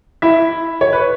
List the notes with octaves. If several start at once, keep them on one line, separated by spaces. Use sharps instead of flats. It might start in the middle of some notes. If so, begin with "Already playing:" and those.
E4 E5
C#5
B4